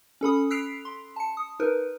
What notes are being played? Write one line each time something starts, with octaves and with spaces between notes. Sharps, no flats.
C#4 A4 B5 D#6
E6 F#6 B6 C7 D7 F7
C6
A5 C#7
D#6
D#4 A#4 B4